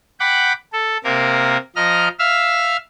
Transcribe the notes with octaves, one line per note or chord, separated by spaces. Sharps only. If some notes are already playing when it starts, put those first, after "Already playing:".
F#5 G5 B5 D6
A4
C3 A#3 A#4
F3 D#5 A#5 F6
E5 F5 E6 F6